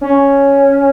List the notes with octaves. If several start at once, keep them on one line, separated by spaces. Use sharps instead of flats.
C#4